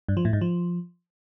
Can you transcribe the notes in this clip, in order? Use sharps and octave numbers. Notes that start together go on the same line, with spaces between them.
G2
F3
A2
G#2
F3